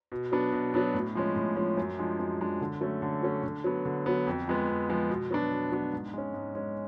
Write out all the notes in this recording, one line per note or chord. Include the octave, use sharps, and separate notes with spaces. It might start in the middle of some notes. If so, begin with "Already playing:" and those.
B2
F#3 B3 D4
B2
F#3 B3 D4
A2
F3 G#3 C#4
A2
F3 G#3 C#4
F#2
F3 G#3 D4
F#2
F3 G#3 D4
D3
F#3 A3 C#4
D3
F#3 A3 C#4
D3
F#3 B3
D3
F#3 B3
F2
F3 G#3 B3
F2
F3 G#3 B3
B2
F#3 B3 D4
B2
F#3 B3 D4
G#2
G#3 C#4
G#2
G#3 C#4